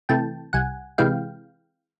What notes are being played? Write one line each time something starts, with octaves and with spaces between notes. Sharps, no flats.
C3 E3 A3 G5 A5
C2 F#5 G#5
C3 E3 G#3 F5 G5